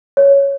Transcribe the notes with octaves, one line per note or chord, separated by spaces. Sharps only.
C#5